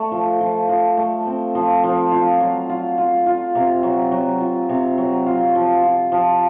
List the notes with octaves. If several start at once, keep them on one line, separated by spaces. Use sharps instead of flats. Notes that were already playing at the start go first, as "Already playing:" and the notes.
Already playing: A3
F3
F3
F3
A3
C4
F3
F3
F4
F#3
F4
F4
F4
C3
F#3
F#3
F4
C3
F#3
F4
F3
F4
F3